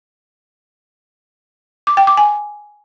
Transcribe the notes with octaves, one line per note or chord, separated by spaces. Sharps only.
D6
G5
D6
G#5